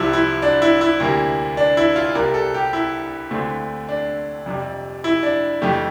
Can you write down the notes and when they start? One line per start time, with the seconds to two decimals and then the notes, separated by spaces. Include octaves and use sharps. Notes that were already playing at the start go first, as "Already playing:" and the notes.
Already playing: C2 C3 F3 E4
0.13 E4
0.42 D4
0.62 E4
0.81 E4
1.00 D2 C3 G3 A#3
1.57 D4
1.77 E4
1.96 F4
2.15 C2 C3 G3 A#4
2.34 A4
2.54 G4
2.73 E4
3.31 D2 D3 A3 C4
3.89 D4
4.46 F2 C3 G3
5.04 E4
5.23 D4
5.62 F2 E3 A3 G4